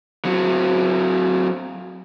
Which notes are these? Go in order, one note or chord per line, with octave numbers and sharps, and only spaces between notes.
F#3 C4